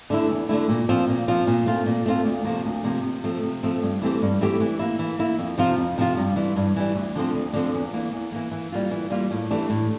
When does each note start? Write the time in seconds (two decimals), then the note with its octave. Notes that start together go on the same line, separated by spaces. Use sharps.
0.10 D3 A3 E4
0.29 E2
0.49 D3 A3 E4
0.69 A#2
0.89 F3 C4 F4
1.08 A#2
1.28 F3 C4 F4
1.47 A#2
1.66 A3 C4 F4
1.86 A#2
2.06 A3 C4 F4
2.25 D2
2.45 C3 F3 A#3
2.65 D2
2.84 C3 F3 A#3
3.03 C3
3.24 F3 A3 C4
3.43 C3
3.63 F3 A3 C4
3.82 G2
4.02 E3 A3 C4 G4
4.22 G2
4.41 E3 A3 C4 G4
4.60 E3
4.79 A#3 E4
4.99 E3
5.19 A#3 E4
5.39 F2
5.58 C3 F3 C4 F4
5.78 F2
5.98 C3 F3 C4 F4
6.17 G2
6.36 E3 G3
6.56 G2
6.76 E3 G3
6.95 D2
7.15 D3 F3 C4
7.34 D2
7.54 D3 F3 C4
7.74 E2
7.93 E3 A#3
8.13 E2
8.32 E3 A#3
8.52 E3
8.72 G3 A#3 F4
8.91 E3
9.10 G3 A#3 F4
9.31 A2
9.51 E3 A3 D4 G4
9.70 A2